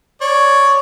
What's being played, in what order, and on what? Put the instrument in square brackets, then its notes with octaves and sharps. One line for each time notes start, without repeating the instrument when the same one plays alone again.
[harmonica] C#5 D5